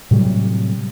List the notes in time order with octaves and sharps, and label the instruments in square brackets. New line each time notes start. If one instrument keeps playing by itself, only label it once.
[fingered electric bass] A2 C3 F#3 G3